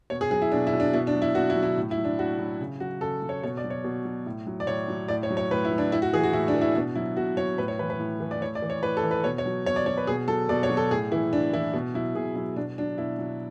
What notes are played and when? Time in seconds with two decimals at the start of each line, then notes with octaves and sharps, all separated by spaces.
0.10 B2 C#5
0.21 G#4
0.31 F#3 G#4
0.42 E4
0.52 B2 D4
0.67 E4
0.73 F#3
0.80 D4
0.93 B2 E4
1.07 D4
1.15 F#3
1.22 E4
1.35 B2 F#4
1.50 E4
1.55 F#3
1.63 E4
1.77 A2
1.91 E4
1.97 F#3
2.04 D4
2.19 A2 F#4
2.39 F#3
2.60 C#3
2.80 F#3 F#4
3.01 C#3 A4
3.22 F#3
3.29 C#5
3.43 B2 C#5
3.57 D5
3.64 F#3
3.70 C#5
3.84 B2
4.05 F#3
4.26 A2
4.47 F#3
4.60 D5
4.67 A2 C#5
4.88 F#3
5.08 A2 D5
5.23 C#5
5.30 F#3
5.37 C#5
5.51 A2 B4
5.65 E4
5.72 F#3
5.78 D4
5.92 A2 E4
6.02 F#4
6.14 E3 G#4
6.23 F#4
6.33 A2 E4
6.48 D4
6.55 E3
6.61 E4
6.75 B2 D4
6.95 F#3 E4
7.17 B2 F#4
7.37 F#3 C#5
7.58 A2 B4
7.68 C#5
7.79 E3 B4
7.90 B4
7.99 A2
8.20 E3
8.31 D5
8.41 A2 C#5
8.55 D5
8.62 E3
8.70 C#5
8.83 A2 B4
8.97 A4
9.03 E3
9.11 B4
9.24 B2 C#5
9.38 C#5
9.46 F#3
9.66 B2 C#5
9.76 D5
9.86 F#3 C#5
9.97 B4
10.07 B2 G#4
10.28 F#3 A4
10.49 B2 D5
10.63 C#5
10.70 F#3
10.77 A4
10.91 A2 G#4
11.12 E3 E4
11.32 A2 D4
11.53 E3 E4
11.74 B2
11.94 F#3 E4
12.15 B2 G#4
12.35 F#3 E4
12.56 B2 D4
12.78 F#3 D4
12.98 B2 E4
13.19 F#3